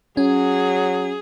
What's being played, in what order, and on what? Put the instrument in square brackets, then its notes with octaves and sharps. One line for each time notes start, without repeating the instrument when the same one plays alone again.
[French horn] F#3 [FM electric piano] C#4 [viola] G#4